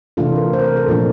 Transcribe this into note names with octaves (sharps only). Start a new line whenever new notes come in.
C3 E3 A3 D4 F4 A4
A#4
C5
A#4
C5
A4
A#2 F3 A3 D4